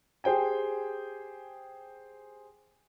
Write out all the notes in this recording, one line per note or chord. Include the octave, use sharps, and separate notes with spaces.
G4 G#4 C5 G5 G#5